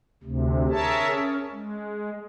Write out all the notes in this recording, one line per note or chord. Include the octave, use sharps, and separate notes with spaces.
D2 C3
G#4 A#4 C#5 E5 A5
C#4
G#3